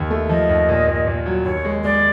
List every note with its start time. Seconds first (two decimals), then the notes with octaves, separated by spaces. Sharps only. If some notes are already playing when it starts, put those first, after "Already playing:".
Already playing: D#2
0.11 A3
0.29 F3 D#5
0.49 D#2
0.69 A#2
0.88 A#2
1.07 A#2
1.26 F#3
1.45 D#2 C#5
1.65 G#3
1.84 G#3 D5